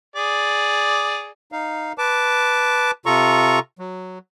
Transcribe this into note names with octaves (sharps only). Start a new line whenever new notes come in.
G#4 D5
D#4 F5
B4 A5 D6
C3 F4 A4 A#5 C#6
F#3